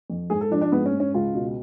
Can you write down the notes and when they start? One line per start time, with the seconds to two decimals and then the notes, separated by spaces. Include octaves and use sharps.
0.10 F2
0.30 G#2 G#4
0.41 A4
0.51 F3 D4
0.61 D4
0.72 G#2 B3
0.86 C#4
0.93 G#2
1.00 C#4
1.14 C#2 F4
1.34 B2